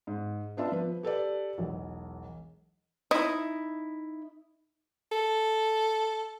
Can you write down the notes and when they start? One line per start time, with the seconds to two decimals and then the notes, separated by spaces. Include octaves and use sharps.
0.07 G#2
0.57 B3 D4 F4 E5 A5
0.72 F3 B4
1.03 G4 A4 B4 D5
1.58 E1 B1
3.11 D#4 E4 D#5
5.12 A4